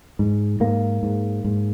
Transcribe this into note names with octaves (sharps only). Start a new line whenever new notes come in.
G#2
G#2 A#3
G#2
G#2